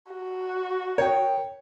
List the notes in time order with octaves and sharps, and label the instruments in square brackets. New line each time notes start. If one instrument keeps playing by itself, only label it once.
[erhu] F#4
[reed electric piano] A#4 G5 [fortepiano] C#5